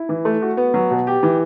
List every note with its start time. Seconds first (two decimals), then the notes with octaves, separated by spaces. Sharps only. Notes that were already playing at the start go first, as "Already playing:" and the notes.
Already playing: E4
0.09 E3
0.25 A3
0.42 F#4
0.57 B3
0.74 F#3
0.91 B2
1.07 G4
1.23 E3